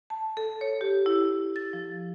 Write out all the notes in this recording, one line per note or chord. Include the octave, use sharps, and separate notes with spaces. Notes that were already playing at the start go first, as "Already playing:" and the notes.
A5
A4
C#5
G4
E4
A6
F3